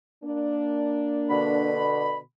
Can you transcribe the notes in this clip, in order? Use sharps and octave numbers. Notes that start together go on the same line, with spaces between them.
A#3 D4
B2 D3 B5